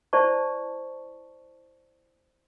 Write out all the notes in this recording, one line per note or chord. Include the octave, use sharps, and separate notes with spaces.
E4 C5 D5 A5 C#6